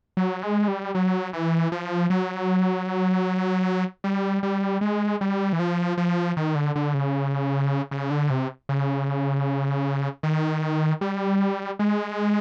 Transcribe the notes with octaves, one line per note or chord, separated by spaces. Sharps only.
F#3
G#3
G3
F#3
E3
F3
F#3
G3
G3
G#3
G3
E3
F3
F3
D#3
D3
D3
C#3
C#3
D3
C3
C#3
D#3
G3
G#3